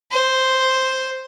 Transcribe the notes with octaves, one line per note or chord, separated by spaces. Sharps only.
C5